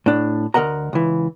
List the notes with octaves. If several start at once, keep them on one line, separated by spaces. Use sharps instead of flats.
A2 D4
D2 A#4 D#5 F#5 A#5
C#2 E3